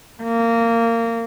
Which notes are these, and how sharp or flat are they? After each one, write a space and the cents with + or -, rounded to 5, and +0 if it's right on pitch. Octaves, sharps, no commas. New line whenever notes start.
A#3 -20